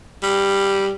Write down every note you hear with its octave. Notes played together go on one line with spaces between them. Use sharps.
G3